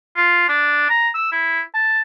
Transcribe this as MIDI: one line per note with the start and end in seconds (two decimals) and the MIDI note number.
0.17 0.45 65
0.48 0.86 62
0.89 1.09 82
1.14 1.32 88
1.32 1.61 64
1.74 2.01 81